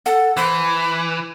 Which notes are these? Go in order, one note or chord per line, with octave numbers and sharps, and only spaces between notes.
A4 F#5
E3 C5 B5